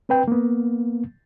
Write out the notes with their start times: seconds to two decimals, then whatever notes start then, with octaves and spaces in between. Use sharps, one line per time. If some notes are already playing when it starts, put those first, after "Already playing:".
0.09 C4 B4 G5
0.28 A#3 B3